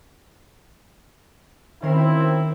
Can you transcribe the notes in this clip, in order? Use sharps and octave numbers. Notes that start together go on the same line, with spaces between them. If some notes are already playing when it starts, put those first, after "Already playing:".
F#1 D#3 C4 E4 A#4 C7